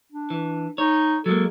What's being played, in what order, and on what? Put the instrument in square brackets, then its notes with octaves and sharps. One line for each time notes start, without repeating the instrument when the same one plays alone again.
[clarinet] D4
[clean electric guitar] E3
[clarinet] D#4 [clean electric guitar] C#5
[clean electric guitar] F#3 G#3 A#3 [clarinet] A4